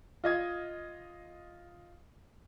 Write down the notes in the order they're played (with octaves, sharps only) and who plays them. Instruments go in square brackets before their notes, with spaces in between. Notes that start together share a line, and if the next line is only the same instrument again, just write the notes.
[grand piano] F4 D#5 G#6